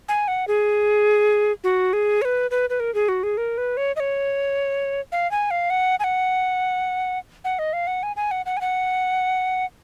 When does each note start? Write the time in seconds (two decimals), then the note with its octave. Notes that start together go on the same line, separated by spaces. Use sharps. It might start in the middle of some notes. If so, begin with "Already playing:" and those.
0.09 G#5
0.28 F#5
0.48 G#4
1.64 F#4
1.93 G#4
2.22 C#5
2.25 B4
2.51 B4
2.70 B4
2.80 A#4
2.94 G#4
3.09 F#4
3.23 G#4
3.37 A#4
3.58 B4
3.77 C#5
3.96 D#5
4.00 C#5
5.12 F5
5.31 G#5
5.51 F5
5.70 F#5
6.00 G#5
6.04 F#5
7.45 F#5
7.59 D#5
7.73 F5
7.87 F#5
8.03 G#5
8.16 G#5
8.31 F#5
8.46 F#5
8.57 G#5
8.61 F#5